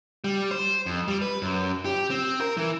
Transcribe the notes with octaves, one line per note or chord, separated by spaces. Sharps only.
G3
C5
F2
G3
B4
F#2
G4
C4
A#4
E3